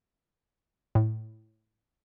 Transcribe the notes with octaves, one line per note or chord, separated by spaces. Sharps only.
A2